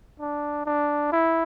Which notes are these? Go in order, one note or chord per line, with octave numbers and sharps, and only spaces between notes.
D4
D4
E4